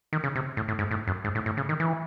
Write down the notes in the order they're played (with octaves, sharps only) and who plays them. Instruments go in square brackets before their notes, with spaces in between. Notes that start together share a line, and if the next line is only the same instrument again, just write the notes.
[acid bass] D#3
C#3
C3
A2
A2
G#2
A2
F#2
G#2
A2
A2
C#3
D#3
E3